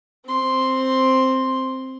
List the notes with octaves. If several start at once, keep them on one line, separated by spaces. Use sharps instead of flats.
C4 C6